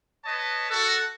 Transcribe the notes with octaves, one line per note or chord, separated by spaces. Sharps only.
B4 C#5 D#5 A5
F#4 A4